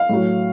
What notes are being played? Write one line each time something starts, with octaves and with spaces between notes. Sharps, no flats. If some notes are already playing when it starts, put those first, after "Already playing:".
Already playing: F5
A2 F#3